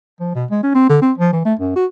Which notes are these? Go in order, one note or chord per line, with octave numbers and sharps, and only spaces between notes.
F3
B2
G#3
C#4
C4
D3
C4
F3
E3
A3
F#2
F#4